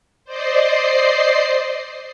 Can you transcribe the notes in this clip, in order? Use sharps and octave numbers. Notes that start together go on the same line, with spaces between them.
C5 D5 D#5 C7